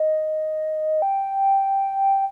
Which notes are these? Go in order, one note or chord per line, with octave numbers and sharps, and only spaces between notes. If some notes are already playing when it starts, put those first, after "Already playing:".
Already playing: D#5
G5